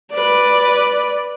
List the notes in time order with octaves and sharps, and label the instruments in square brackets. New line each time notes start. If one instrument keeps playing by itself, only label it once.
[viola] B4 D5